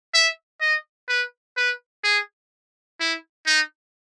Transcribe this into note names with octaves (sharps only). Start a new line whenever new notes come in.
E5
D#5
B4
B4
G#4
E4
D#4